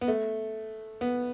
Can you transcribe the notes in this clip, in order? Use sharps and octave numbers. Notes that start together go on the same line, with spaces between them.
B3
A3
B3